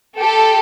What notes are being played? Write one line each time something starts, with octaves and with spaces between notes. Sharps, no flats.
G4 A4